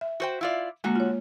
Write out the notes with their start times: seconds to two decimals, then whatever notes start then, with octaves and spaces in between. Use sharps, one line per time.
0.01 E5
0.20 F#4 C5 G5
0.41 E4 F4 D5
0.84 D3 G#3 A#3 F#4
0.96 F4 C#5